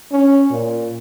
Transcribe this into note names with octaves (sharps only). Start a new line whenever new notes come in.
C#4
A#2